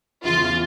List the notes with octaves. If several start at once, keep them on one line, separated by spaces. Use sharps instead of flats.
E2 C#3 E3 F4